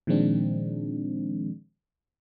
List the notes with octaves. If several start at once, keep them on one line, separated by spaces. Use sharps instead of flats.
A#2 D#3 F3 G#3 C4 D4